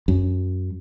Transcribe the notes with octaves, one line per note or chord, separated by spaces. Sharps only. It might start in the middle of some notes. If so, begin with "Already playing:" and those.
F#2